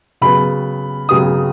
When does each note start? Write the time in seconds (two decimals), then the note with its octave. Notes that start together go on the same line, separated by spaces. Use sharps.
0.21 C#3 F#3 B3 B5
1.09 C#3 F#3 B3 D#6